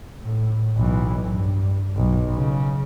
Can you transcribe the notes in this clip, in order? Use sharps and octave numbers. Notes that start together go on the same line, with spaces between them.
A2
B1 E3
G2
B1
C#3